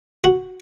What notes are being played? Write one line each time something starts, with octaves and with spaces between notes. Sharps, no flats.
F#4